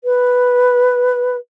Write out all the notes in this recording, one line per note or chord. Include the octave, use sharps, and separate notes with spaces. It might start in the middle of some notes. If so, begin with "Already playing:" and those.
B4